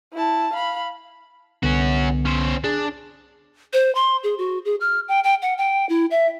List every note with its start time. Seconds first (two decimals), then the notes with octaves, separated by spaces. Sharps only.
0.13 E4 A5
0.53 F5 B5
1.63 C2 D3 B3 C#4 F#4
2.25 C#4 C5
2.64 D4 G#4
3.73 C5
3.95 C6
4.24 G#4
4.38 F#4
4.65 G#4
4.81 F6
5.08 G5
5.24 G5
5.42 F#5
5.58 G5
5.89 E4
6.11 E5